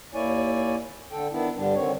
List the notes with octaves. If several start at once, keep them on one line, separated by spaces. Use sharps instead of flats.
D#2 A#3 E4 C#5 D5 G#5
D3 A4 G5
D#3 B3 D4 E4
G2 D3 G3 D4
D3 D#3 C4 C#5